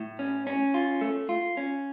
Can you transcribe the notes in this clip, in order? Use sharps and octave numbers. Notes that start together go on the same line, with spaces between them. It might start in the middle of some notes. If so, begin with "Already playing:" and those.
Already playing: A2
C#4
C#4
F4
A3
F4
C#4